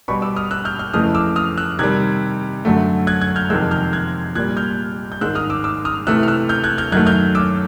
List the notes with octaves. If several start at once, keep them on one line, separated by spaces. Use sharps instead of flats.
B2 G3 B5 C#6
D6 E6
D#6 F6
E6 F#6
F6 G6
F6 G6
F2 C#3 E3 A3 D#6 F6
D6 E6
D#6 F6
E6 F#6
C3 D#3 G3 F#6 G#6
F#2 D3 F#3 A3
F#6 G#6
F#6 G#6
F6 G6
F2 C3 D#3 G#3 E6 F#6
F6 G6
F#6 G#6
A#2 G3 F#6 G#6
F6 G6
G6
G#2 D#3 G#3 E6 F#6
D#6 F6
D6 E6
D6 E6
D#6 F6
C3 E3 A3 E6 F#6
F6
E6 F#6
F6 G6
F#6 G#6
F6 G6
F#2 D#3 F#3 A3 F#6 G#6
F6 G6
D6 E6